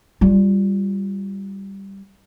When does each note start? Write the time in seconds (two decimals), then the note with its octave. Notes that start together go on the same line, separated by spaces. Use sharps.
0.21 G3 F4